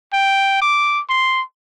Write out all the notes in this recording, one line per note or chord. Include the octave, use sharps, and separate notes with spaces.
G5
D6
C6